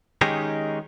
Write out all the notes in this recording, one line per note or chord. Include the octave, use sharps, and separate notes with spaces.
D#3 G#3 C#4 D#4 G4 G#4